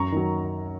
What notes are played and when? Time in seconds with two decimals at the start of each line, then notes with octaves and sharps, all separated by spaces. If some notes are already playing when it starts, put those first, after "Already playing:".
Already playing: F#2 A#5 C#6
0.12 D#3 F#3